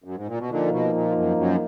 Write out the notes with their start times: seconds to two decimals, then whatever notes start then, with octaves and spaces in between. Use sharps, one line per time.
0.04 F#2
0.16 G#2
0.27 A#2
0.39 B2
0.49 A#2 D3 F3 A#3 D#4
0.72 B2
0.94 A#2
1.14 F#2
1.37 F#2